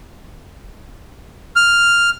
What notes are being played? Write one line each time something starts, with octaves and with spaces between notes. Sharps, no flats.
F6